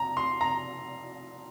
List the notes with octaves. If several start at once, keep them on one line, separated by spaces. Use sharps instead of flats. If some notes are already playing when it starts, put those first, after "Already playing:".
Already playing: A#5
C6
A#5